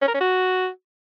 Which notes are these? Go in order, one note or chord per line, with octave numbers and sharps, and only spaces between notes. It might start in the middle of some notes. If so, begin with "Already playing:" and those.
C#4
A#4
C#4
F#4